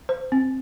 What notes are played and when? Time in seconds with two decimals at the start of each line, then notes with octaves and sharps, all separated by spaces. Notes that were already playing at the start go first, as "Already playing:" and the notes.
0.09 C5
0.32 C4